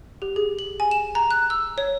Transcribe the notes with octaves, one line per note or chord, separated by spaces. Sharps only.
G4
G#4
F#7
G#5
E7
A#5
F#6
E6
C#5